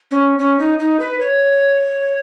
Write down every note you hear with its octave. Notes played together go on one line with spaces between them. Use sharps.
C#4
C#4
D#4
D#4
B4
C#5